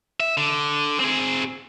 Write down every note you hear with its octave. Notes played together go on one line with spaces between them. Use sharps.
E5
D3
C4 G#4